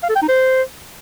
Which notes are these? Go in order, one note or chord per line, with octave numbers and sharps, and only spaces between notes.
F5
A4
G5
D#4
C5